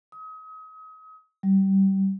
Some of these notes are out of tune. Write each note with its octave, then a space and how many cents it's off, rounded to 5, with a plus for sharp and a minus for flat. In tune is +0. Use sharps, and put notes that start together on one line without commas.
D#6 +35
G3 -20